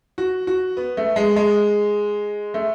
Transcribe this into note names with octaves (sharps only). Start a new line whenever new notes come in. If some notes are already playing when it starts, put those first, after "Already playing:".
F#4
F#4
B3
A3
G#3
G#3
A3